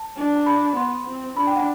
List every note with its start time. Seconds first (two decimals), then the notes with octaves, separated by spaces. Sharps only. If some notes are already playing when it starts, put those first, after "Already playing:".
Already playing: A5
0.17 D4
0.36 A5
0.46 B5
0.76 B3 C6
1.07 C4
1.37 D4 B5
1.47 G5
1.56 F#5